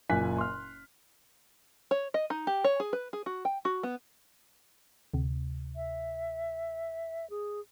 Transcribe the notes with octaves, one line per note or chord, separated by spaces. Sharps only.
F#1 A#2 G#5 F#6 B6
C6 F6
C#5
D#5
D#4
G4
C#5
G#4
B4
G#4
F#4
G5
F#4
B3
D2 C3
E5
G#4